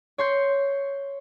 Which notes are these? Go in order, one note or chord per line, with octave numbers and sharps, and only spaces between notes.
C#5 C6 G6